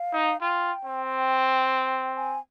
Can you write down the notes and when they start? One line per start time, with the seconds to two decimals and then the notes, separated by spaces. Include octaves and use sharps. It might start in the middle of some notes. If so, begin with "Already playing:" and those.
Already playing: F5
0.13 D#4
0.41 F4 G5
0.85 C4
2.16 G#5